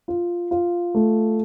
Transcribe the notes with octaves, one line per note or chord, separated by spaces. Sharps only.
F4
F4
A3